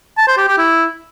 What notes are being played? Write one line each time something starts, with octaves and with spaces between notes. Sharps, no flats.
A5
C5
G4
G4
E4